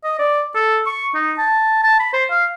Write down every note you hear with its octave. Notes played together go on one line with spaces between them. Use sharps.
D#5
D5
A4
C#6
D#4
A5
A5
B5
C5
F5